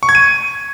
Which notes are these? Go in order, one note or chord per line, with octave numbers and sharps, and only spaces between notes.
C#6
G#6
D#7